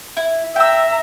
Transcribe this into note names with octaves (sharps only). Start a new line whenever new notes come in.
E4
E5 G5 A#5 E6